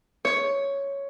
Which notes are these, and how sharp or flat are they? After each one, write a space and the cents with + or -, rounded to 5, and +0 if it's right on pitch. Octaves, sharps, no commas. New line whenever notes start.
C#5 +5